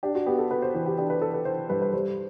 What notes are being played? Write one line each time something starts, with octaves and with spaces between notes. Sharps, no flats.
D4 G4
F#4
B3 G4
A4
B3 B4
C5
E3 C5
G4
D4 G4
B4
E3 A4
B4
E3 C5
G2 B4
B4
G3 C5